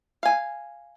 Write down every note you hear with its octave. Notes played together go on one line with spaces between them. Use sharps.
F5 G#5